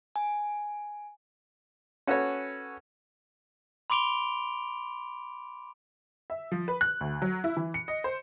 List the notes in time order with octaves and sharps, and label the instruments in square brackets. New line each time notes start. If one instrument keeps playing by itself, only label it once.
[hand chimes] G#5
[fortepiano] C#4 F#4 A4 B4 C#5
[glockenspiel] B5 C6 D6 D7 F7 G7
[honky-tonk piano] E5
F3
B4
F#6
D2
F#3
E4
E3
C#7
D#5
C5